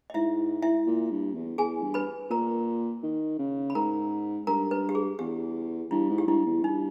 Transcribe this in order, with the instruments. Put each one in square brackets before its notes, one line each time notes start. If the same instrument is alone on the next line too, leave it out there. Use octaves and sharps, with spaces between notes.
[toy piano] D#5
[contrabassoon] G#2 [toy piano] E4 E5
[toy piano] E4 E5
[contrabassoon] A#2
G2
E2
[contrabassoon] E2 [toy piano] G#4 G#5
[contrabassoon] G2
[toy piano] B4 B5
[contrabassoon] A#2 [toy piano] A#4 A#5
[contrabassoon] D#3
C#3
[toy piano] B5
[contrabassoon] G#2 [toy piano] A#4 A#5
[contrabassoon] G2 [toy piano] A#4 A#5
[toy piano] B4
G4
G#4
[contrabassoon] E2 [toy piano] G4
[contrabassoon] G2 [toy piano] E4
[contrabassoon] G#2
[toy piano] G4
[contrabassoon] G2 [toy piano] E4
[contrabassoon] E2
[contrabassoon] G2 [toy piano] D#4